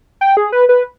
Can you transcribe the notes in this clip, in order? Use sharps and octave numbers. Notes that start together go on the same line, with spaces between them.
G5
G#4
B4
B4